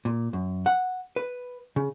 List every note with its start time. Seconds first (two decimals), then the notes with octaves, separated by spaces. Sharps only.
0.05 A#2
0.33 F#2
0.66 F#5
1.16 B4
1.76 C#3